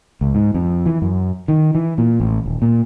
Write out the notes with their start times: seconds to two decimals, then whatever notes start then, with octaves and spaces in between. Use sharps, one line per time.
0.21 C#2
0.35 G#2
0.54 F2
0.86 E3
1.02 F#2
1.48 D#3
1.75 E3
1.98 A#2
2.20 A1
2.46 D#1
2.62 A#2